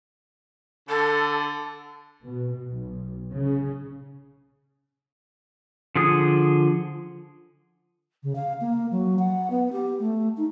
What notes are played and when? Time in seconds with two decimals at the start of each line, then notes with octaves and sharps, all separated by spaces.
0.89 D3 A4
2.24 B2
2.71 B1
3.34 C#3
5.96 D3 F3 G#4 D#6
8.23 C#3
8.35 F5
8.61 A#3
8.91 F#3
9.19 F#5
9.50 B3
9.72 G4
9.99 A3
10.37 D#4